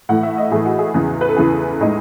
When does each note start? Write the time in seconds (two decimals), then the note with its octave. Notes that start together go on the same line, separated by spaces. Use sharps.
0.09 A2 E3 A3 F#5
0.23 E5
0.37 D#5
0.51 A2 E3 A3 G#4
0.65 F#4
0.79 G#4
0.94 E2 C#3 E3
1.21 B4
1.29 A4
1.36 E2 C#3 E3 G#4
1.80 A2 G#3 D#4